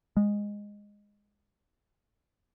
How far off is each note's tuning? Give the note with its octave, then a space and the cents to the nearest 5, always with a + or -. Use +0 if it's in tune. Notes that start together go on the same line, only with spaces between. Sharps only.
G#3 -15